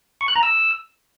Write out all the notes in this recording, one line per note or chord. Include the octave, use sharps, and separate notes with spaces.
C#6
F#6
A#5
E6